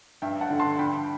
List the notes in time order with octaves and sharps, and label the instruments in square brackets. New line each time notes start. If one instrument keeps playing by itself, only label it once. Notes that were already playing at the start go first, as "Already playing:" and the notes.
[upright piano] G2 E5 G5
F#5 A5
D3
A5 C6
G2 G5 B5